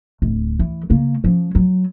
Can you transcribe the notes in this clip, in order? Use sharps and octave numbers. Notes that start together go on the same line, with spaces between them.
D1
E3
C#3 A#3
F3 C#4
F#3